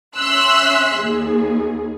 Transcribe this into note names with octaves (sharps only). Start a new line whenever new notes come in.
C#4 E5 C6 E6 F#6
D#2 G#4